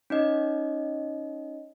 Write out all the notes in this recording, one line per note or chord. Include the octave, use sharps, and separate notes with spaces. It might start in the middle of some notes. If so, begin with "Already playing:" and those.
C#4 D#4 D#5